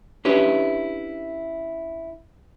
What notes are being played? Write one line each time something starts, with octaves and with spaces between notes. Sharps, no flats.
C#4 D4 E4 G4 B4